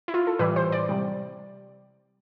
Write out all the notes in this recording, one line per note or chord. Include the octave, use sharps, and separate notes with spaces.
E4
F4
A4
A2 E3 G3 B4
C5
D5
C3 G3